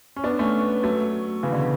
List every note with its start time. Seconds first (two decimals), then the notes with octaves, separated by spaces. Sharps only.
0.16 C#4
0.24 B3 D4
0.39 A3 C#4
0.83 F#3 A3
1.43 C#3 E3
1.52 B2 D3